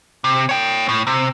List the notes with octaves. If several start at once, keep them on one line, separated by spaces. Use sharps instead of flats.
C3
C#5 G5
A2
C3